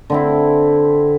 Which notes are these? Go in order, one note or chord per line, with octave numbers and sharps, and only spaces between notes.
D3 C4 E4